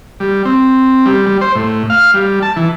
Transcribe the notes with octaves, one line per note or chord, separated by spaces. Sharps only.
G3
C4
G3
G3
C5
A2
F5
G3
A5
E3